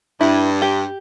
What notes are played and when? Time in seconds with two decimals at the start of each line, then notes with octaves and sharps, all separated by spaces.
0.21 G2 E4
0.62 G4